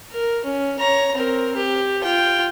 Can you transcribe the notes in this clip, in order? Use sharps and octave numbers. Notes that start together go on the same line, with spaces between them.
A#4
C#4
C#5 A#5
C4 A#4
G4
F4 G5